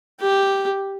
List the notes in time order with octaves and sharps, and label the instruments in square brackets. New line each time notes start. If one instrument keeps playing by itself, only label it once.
[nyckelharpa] G4